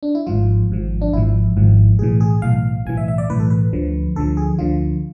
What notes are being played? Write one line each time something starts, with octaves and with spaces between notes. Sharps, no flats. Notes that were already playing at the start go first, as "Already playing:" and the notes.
D4
E4
G#1 G#2 F3 F4
G#1 G#2 F3
D4
G#1 G#2 F3 E4
G#1 G#2 F3
B1 A2 E3 G#4
G#4
B1 A2 E3 F5
B1 A2 E3 G#5
E5
E5
D5
B1 A2 E3 B4
A4
B4
D2 D3 F3
D2 D3 F3 A4
G#4
D2 D3 F3 F4